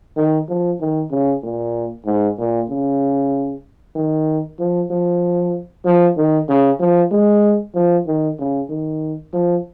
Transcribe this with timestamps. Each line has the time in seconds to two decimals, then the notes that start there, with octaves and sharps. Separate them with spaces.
0.17 D#3
0.49 F3
0.80 D#3
1.11 C#3
1.43 A#2
2.06 G#2
2.38 A#2
2.69 C#3
3.95 D#3
4.59 F3
4.90 F3
5.85 F3
6.17 D#3
6.49 C#3
6.80 F3
7.11 G#3
7.75 F3
8.07 D#3
8.39 C#3
8.70 D#3
9.33 F3